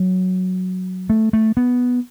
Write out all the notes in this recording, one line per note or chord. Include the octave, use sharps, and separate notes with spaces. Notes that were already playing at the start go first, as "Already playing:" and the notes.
Already playing: F#3
A3
A3
B3